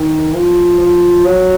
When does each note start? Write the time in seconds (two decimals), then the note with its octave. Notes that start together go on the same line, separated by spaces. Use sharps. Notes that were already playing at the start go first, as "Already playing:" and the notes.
Already playing: D#3
0.35 F3
0.80 F3
1.25 F#3